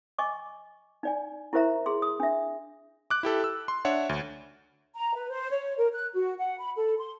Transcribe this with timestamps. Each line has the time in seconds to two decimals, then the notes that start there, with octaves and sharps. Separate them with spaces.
0.18 D#5 G#5 C#6 D6
1.03 D#4 D5 G#5
1.53 E4 G4 A#4 C5 E5 A#5
1.86 G#4 C6
2.02 D#6
2.20 D4 E5
3.10 D6 F#6
3.23 E4 G4 A4
3.44 E6
3.68 C6
3.85 D4 C#5 E5 F#5
4.09 D2
4.95 A#5
5.14 B4
5.30 C5
5.50 C#5
5.77 A#4
5.93 F#6
6.14 F#4
6.38 F#5
6.60 B5
6.75 A4
6.98 C6